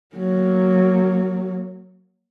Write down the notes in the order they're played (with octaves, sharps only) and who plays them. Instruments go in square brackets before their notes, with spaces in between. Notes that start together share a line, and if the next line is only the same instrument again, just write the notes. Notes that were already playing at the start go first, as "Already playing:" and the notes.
[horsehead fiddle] F#3 A#3